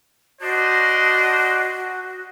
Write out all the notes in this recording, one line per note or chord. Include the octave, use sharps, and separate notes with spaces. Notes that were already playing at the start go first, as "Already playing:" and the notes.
D4 F#4 C5 D#5